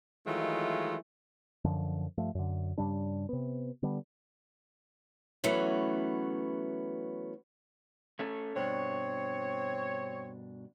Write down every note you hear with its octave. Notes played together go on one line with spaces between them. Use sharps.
D#3 E3 F#3 G#3 A3 F4
F#2 D3 F3
G2 F3 A3
F#2 D3
G2 C#3 G3 D4
C3 B3
D3 G3 B3
E3 F#3 A3 B3 C#4
A3 C#4 A4
G2 B2 C4 D4 C#5